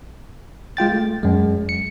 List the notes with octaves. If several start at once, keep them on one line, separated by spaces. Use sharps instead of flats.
G#3 F4 G5 A6
A3
F#2 G#3
C#7